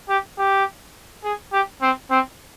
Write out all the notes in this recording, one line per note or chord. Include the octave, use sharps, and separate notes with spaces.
G4
G4
G#4
G4
C4
C4